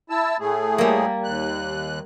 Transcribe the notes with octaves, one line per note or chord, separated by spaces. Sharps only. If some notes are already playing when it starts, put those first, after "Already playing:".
E4 A5 E6
A2 A3 G#4
G3 A#3
D#2 F#6